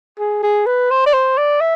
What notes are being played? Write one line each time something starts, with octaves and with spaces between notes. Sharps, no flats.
G#4
G#4
B4
C5
D5
C5
D5
E5